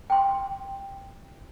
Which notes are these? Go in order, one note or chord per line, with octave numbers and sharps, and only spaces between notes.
G5 C6